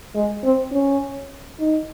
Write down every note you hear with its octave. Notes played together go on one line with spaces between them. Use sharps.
G#3
C4
C#4
D#4